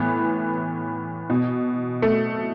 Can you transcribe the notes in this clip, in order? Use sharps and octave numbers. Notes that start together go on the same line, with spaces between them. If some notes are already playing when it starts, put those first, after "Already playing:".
Already playing: A2 E3 B3
B2
A3